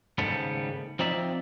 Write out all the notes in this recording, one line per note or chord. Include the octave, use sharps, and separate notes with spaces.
D#2 G#2 C#3 G3 B3 A4
F3 C4 D#4 D5 E5